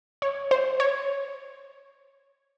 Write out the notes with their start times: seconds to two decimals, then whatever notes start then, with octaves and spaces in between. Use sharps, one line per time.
0.22 C#5
0.51 C5
0.80 C#5